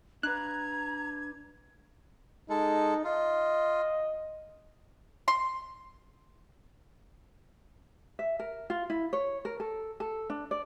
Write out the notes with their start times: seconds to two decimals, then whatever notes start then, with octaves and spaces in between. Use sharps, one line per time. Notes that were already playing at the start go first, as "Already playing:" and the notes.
0.23 D4 B4 A#5 F#6 G#6
2.50 G#3 D#4 A4
3.04 F4 D#5
5.28 C6
8.19 E5
8.39 A#4
8.70 F4
8.90 E4
9.13 C#5
9.45 A#4
9.60 A4
10.00 A4
10.30 D4
10.51 D5